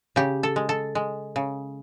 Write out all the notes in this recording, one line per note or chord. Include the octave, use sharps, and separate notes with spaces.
C#3 G4
A4
G#3
A4
G#3
C#3